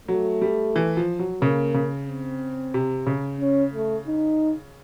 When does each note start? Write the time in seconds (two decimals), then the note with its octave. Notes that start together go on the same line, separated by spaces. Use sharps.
0.08 F#3 A3
0.42 G3
0.76 E3
0.97 F3
1.19 F#3
1.42 C#3 A#3
1.75 C#3
2.08 C4
2.74 C3
3.07 C#3
3.41 C#4
3.74 A3
4.07 D#4